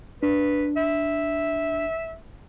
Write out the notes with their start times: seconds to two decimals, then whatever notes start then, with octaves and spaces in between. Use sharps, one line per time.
0.23 D4 B4
0.77 E5